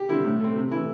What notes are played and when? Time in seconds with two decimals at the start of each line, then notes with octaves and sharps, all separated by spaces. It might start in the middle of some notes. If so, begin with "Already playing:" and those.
Already playing: G4
0.09 D3 G3 C4 E4
0.25 A2
0.40 A3 C4
0.56 C3
0.71 E3 A3 E4